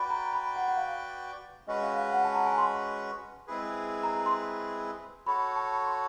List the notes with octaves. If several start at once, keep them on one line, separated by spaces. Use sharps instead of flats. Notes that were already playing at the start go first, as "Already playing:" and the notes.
Already playing: F#4 B4 D5 G5 B5
A#5
B5
F#5
F#5
F5
G#3 C#4 F#4 B4 D#5
F5
F5
F#5
A5
A#5
G#5
C6
G#3 C4 E4 G#4 B4
A#5
A#5
C6
F#4 A4 C#5 B5
A5
B5
C6